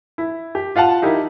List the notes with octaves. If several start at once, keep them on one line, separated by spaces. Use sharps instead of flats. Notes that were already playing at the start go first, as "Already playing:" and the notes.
E4
G4
F4 F5 F#5 A5
D#4 E4 G4 A#4